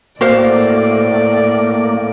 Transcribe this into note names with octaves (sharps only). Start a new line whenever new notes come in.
A2 A#3 F#4 C5 D5 F5